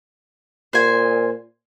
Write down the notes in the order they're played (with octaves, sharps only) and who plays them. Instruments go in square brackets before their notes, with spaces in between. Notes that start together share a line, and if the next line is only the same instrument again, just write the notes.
[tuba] A#2 [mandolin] C5 G#5